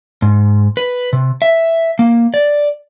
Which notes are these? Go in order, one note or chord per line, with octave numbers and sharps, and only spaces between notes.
G#2
B4
C3
E5
A#3
D5